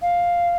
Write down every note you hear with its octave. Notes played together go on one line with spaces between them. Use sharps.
F5